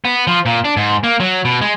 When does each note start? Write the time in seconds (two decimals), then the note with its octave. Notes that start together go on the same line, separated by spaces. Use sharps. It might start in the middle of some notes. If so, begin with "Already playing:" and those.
0.05 B3
0.27 F3
0.46 A#2
0.65 D4
0.77 G#2
1.04 A#3
1.20 F#3
1.45 B2
1.61 G#3